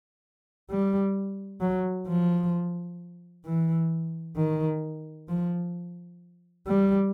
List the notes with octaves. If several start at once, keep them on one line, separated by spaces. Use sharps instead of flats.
G3
F#3
F3
E3
D#3
F3
G3